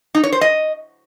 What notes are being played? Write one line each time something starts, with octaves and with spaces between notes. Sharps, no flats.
D#4
C#5
C5
D#5